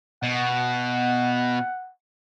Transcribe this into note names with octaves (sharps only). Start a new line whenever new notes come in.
B2 F#5